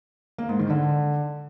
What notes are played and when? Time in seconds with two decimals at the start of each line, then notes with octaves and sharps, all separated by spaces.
0.38 A#3
0.49 G#2
0.59 D#3
0.70 D3